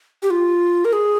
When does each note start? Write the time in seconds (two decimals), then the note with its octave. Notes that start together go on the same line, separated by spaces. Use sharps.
0.22 G4
0.30 F4
0.85 A#4
0.93 G#4